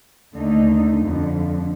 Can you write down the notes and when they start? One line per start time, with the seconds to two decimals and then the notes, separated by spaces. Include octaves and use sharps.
0.34 D#2 D3 A3 D#4
1.00 F2 D3 F3